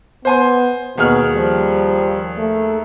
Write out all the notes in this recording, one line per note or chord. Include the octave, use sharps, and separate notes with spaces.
B3 C5 G#5 C6
D#2 B2 G#4 F6
F3 G3
A3